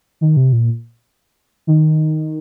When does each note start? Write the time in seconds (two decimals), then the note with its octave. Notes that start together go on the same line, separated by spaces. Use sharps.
0.21 D#3
0.37 C3
0.53 A#2
1.67 D#3